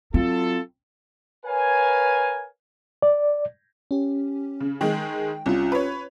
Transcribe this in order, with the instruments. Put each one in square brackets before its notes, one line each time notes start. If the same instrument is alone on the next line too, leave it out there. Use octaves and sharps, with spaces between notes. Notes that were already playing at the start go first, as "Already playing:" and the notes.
[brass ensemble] F#3 F4 A4 [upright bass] C4
[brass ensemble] A#4 B4 C#5 F5 G#5
[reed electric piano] D5
[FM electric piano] C#4 G4
[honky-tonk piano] C#3
[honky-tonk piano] D#3 G#3 D#4 [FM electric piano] G5
[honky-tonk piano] C2 [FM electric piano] C#4 F4
[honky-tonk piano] B4 C#5